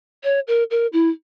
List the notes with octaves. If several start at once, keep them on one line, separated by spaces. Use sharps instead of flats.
C#5
A#4
A#4
E4